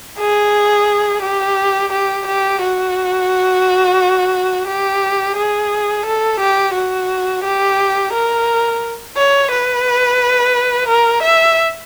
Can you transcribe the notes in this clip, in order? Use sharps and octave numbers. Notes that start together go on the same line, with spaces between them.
G#4
G4
G4
G4
F#4
G4
G#4
A4
G4
F#4
G4
A#4
C#5
B4
A#4
E5